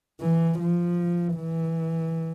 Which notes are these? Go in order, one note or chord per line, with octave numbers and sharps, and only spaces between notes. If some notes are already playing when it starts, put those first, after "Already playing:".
E3
F3
E3